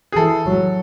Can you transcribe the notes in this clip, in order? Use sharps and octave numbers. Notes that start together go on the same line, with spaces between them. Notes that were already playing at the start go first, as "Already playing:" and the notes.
G#4
E3 A4
F#3